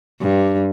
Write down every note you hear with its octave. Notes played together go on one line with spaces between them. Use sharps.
G2